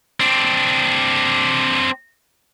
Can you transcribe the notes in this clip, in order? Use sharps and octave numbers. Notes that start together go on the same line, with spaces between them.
C4 D4